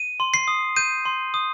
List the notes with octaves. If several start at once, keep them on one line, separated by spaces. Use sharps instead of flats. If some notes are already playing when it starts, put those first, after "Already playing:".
Already playing: D#7
C6
C7
D#6
G6 D#7
C6
D#6